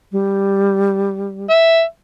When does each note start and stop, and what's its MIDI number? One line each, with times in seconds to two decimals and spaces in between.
0.12 1.47 55
1.50 1.82 76